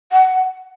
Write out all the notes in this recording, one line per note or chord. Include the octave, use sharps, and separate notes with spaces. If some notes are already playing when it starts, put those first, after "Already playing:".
F#5